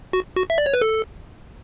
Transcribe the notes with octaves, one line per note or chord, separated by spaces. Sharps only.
F#4
F#4
E5
D5
C#5
B4
A4